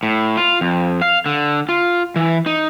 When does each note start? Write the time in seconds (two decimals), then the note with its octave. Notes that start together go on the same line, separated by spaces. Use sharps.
0.03 A2
0.37 F4
0.61 F2
1.02 F5
1.26 D3
1.69 F4
2.16 E3
2.46 D#4